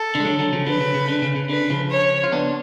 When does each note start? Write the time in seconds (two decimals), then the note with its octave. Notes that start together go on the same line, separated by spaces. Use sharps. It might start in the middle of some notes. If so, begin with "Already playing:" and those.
Already playing: A4
0.15 D3
0.20 G#3
0.25 D3 F#3
0.39 D3 F#3
0.53 C#3 F3
0.66 D3 F#3 B4
0.81 C#3
0.94 C#3
1.08 D3
1.22 C#3
1.36 C#3
1.49 D3 B4
1.70 C#3 F3
1.91 C#5
2.24 F4
2.32 B3 D4